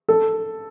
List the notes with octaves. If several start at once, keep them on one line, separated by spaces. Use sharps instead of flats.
A4